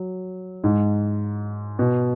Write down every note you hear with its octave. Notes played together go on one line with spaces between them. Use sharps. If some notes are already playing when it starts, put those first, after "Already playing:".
Already playing: F#3
G#2
B2